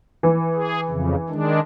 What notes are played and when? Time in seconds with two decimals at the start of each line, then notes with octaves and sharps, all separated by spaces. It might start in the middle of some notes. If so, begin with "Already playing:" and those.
0.23 E3
0.55 G#4
0.89 F2 C#3
1.29 D#3 G#3 D4